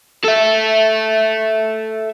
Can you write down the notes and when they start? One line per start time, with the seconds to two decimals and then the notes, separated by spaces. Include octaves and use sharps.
0.25 A4 E5